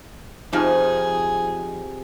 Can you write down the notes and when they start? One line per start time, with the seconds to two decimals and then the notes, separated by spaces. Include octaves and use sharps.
0.53 F2 C3 F3 D#4 G#4